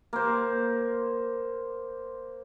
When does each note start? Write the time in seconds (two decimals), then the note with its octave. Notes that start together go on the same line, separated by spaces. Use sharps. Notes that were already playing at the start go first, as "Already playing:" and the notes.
0.13 A#3 C5